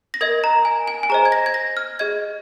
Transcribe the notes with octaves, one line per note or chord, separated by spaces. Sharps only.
A#6
A#4 D#5 G#6
A#5
G#5
G#5
G#5
G#4 C5 D#5 A#5
G#6
A#6
G#6
A#6
F6
G#4 D#5 G#6